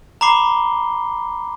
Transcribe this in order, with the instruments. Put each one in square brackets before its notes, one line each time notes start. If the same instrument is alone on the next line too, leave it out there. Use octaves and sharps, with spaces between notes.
[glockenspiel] A#5 B5 D6 C7 G7